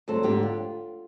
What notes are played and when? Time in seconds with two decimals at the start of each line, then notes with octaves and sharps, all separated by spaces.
0.08 D2 G2 F#3 C4 A4 C5
0.23 F2 G#2 D3 G4
0.43 F4